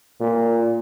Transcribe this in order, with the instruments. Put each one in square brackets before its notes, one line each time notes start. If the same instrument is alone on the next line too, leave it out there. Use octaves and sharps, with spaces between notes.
[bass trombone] A#2